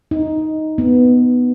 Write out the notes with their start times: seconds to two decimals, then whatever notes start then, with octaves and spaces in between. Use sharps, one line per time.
0.11 D#4
0.78 B3